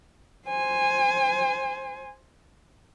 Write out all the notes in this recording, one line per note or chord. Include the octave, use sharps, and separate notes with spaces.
C5 G#5